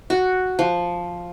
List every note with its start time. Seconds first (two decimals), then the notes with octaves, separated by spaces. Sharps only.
0.10 F#4
0.59 F3